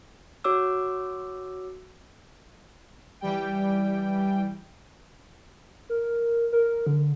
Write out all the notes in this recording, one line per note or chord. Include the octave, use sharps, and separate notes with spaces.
F#4 C#5 D6 E6
E3 G3 G5
A#4
A#4
D3